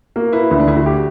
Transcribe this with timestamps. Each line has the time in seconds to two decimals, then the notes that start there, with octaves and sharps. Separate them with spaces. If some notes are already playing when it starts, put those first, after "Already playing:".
0.16 A#3 F#4
0.33 E4 B4
0.51 D2 E4
0.60 D4
0.67 D2 E4
0.77 F#4
0.86 G4